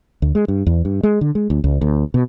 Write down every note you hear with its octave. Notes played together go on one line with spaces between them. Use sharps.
D2
G#3
G2
E2
G2
G#3
D3
G#3
D2
C#2
D2
B2